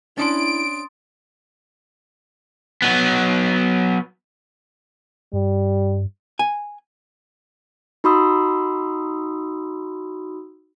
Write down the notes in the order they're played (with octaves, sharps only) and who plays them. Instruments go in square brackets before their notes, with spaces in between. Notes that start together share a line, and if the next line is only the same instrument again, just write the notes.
[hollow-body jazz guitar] C#4 D4 [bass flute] E4 [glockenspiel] C6 D#6 A6 [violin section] D7
[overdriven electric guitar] F#3 B3
[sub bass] G2 [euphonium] G3
[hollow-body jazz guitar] G#5
[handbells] D#4 F#4 B5 C6 D#6 E6